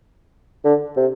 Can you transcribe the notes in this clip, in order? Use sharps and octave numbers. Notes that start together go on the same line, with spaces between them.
D3
C3